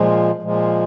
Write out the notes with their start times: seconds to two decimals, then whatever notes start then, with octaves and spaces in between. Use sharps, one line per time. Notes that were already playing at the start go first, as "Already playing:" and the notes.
Already playing: A#2 F3 G#3
0.42 A#2 F3 G#3